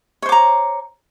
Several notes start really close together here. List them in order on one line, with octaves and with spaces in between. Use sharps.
C#5 C5 D6 A#5